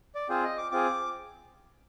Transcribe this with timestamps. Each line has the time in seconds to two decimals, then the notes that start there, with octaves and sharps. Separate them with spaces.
0.15 D5
0.29 C4 F4 G#4 C5
0.44 D#5
0.58 D6
0.72 C4 F4 G#4 D6